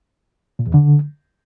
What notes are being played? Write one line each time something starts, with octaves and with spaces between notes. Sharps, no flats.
A#2
E2
D3